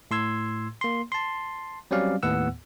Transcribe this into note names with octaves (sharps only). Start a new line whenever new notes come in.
A2 C6 E6 G#6
A#3 C6
A5 C6
F#3 G3 C4 C#4 D5 F5
D#2 A2 B3 F#5 E6